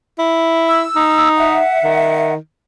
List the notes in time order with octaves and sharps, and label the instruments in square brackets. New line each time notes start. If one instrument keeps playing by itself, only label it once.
[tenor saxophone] E4
[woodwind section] E6
[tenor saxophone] D#4
[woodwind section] E5 F#5
[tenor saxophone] D#3